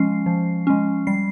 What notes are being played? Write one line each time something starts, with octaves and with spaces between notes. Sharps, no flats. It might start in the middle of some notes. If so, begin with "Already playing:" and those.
Already playing: F3 G#3 C#4 C7
F3
G#3 C#4
G3 C7